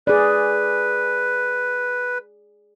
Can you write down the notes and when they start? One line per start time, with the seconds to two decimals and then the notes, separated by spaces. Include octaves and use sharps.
0.07 G#4 B4 D5